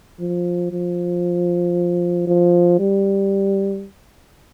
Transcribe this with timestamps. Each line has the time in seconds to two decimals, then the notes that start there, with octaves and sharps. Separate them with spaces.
0.20 F3
0.72 F3
2.27 F3
2.79 G3